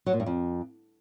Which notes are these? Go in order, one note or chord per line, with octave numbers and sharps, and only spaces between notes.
F#3
A#2
G2
F2